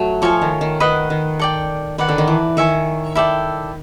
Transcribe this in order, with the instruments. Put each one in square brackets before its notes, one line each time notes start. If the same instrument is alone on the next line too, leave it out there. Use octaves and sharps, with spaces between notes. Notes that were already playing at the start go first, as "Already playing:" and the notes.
Already playing: [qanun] F#3 A3
[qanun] F3 [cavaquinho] A4 C#5 F5 G#5
[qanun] D#3
D#3
[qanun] D#3 [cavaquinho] B4 D#5 F#5
[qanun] D#3
[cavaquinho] A4 D5 G5
[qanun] D#3 [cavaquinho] B4 D5 F#5
[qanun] D3
D#3
E3
[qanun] D#3 [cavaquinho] C#5 E5 G#5 C#6
[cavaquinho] E4 A4 D5 G5